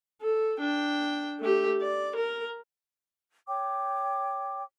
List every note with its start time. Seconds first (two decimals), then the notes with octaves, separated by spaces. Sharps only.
0.22 A4
0.60 D4 G5
1.39 A3 G4
1.81 D5
2.15 A#4
3.48 C#5 G5 D6